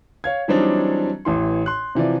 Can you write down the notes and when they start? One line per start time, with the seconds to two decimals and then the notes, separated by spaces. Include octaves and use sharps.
0.24 C#5 F5 G#6
0.48 E3 F#3 G3 C4 D4 D#4
1.25 A1 E3 C6
1.66 C6 F#6
1.95 C3 E3 F3 D5